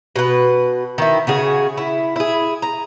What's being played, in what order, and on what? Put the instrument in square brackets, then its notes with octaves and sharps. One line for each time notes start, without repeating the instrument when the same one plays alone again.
[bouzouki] B2 B4
D#3 E4
C#3 F#4 G#4
E4
E4 G#4
A#5